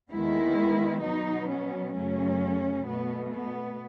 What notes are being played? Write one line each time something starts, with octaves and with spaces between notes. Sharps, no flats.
D#2 D#3 G#3 B3 E4
B2 F#3 B3 D#4
C#4
F#2 C#3 F#3 A3 C#4
B2 A3 B3
B3